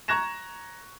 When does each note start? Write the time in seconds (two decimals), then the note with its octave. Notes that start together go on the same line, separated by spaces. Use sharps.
0.08 A#5 C#6 F#6 G#6 A#6 E7